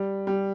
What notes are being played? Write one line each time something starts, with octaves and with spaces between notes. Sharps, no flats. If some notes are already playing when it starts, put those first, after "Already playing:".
Already playing: G3
G3